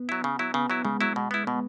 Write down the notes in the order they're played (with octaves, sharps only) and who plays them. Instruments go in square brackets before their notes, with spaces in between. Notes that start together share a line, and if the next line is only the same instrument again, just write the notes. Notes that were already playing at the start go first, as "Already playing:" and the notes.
Already playing: [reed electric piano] B3
[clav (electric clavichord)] F#3 E4
C#3
F#3 E4
[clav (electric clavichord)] C#3 [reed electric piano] B3
[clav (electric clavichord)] F#3 E4
[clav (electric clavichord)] C#3 [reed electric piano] G#3
[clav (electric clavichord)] F#3 E4
B2
B3 E4
[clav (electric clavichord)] B2 [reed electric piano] B3